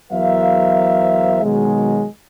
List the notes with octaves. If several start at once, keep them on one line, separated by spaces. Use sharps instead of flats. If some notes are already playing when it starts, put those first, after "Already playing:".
E2 F#3 A#4 C5 E5 F5
B2 D#3 F#3 G#3